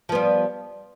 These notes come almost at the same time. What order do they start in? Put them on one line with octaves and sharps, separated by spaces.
F3 B3 G3